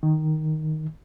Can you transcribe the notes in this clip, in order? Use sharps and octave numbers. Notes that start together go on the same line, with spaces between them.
D#3